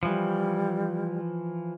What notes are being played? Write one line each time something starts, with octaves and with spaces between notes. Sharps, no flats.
E3 F3 G3